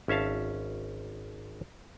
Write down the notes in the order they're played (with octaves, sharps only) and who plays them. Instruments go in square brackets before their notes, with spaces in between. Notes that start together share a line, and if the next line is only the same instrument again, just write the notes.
[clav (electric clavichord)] G#1 C#4 E5 F5 A5